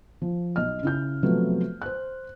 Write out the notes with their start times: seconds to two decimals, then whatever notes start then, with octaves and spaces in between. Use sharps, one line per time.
0.22 F3
0.56 B1 D#5 F6
0.83 C#3 E4 G6
1.23 C3 F3 F#3 A3 B3
1.82 C5 F#6